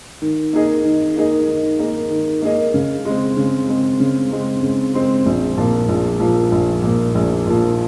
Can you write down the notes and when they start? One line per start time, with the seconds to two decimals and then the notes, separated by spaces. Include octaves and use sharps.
0.22 D#3
0.53 A#3 D#4 G#4 D#5
0.85 D#3
1.16 A#3 D#4 G#4 D#5
1.48 D#3
1.79 A#3 D#4 G#4 D#5
2.11 D#3
2.42 A#3 D#4 G#4 D#5
2.74 C#3
3.05 G#3 C4
3.37 C#3
3.68 G#3 C4
4.00 C#3
4.31 G#3 C4
4.62 C#3
4.94 G#3 C4
5.26 A#1
5.57 A#2 F3
5.88 A#1
6.20 A#2 F3
6.52 A#1
6.83 A#2 F3
7.15 A#1
7.47 A#2 F3